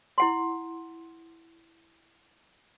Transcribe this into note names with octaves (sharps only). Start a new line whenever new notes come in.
E4 F#5 C6